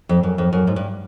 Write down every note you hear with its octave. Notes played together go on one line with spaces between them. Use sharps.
F2
F#2
F2
F#2
G#2
G2